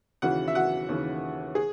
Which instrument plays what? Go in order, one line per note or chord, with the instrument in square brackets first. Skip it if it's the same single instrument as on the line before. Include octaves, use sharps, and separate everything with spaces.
[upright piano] D#2 C#3 E3 F#4 F#5
E5
F#4 F#5
D#2 C#3 E3
G#4